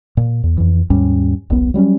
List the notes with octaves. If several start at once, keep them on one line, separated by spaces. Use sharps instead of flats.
A#2
E2
F2 E3
D#2 G#2 G3 C#4
D#1 B1 B3
F#3 G3 B3 C#4